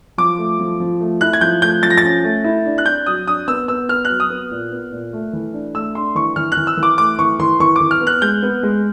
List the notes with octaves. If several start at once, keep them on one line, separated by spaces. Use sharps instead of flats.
F3 D6
A3
F3
F3
A3
E4 F#6
G#6
F3 G6
A3 G6
F3 A6
A#6
A6
C#4
A3
E4
D4
F#6
D4 G6
F#3 D#6
D4 D#6
B3 E6
B3 E6
B3 F6
F#6
F#3
D#6
B3
A#2
B3
A#2
A3
E3
D4
A3 E6
D4 C6
E3 C#6
E3 F6
F#6
E3
E6
E3
D6
A3 D6
E3 C#6
E3 C6
E3 C#6
E3 D6
F6
B3
F#6
G#3 G6
B3
G#3